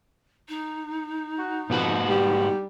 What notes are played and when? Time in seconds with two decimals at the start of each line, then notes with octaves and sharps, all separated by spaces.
0.48 D#4
1.38 F#4
1.70 F2 G#2 B3 F#4
2.09 G3